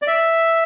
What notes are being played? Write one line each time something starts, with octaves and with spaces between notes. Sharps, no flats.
D5
E5